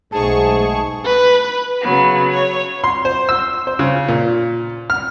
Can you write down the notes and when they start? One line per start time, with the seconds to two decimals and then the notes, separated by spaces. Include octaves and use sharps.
0.12 B1 G#2 B2 A3 G#4 A5 C#6
1.06 B4
1.81 C#3 F#3 B3
2.32 C#5
2.84 C6
3.05 C5
3.29 E6
3.67 C5
3.79 C#3
4.08 A#2
4.90 F6